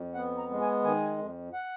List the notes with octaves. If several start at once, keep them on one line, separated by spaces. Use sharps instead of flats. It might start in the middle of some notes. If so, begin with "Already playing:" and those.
Already playing: F2
B3 F#5
A#5
G#3
G#5
D#3 G#5
F2
F#5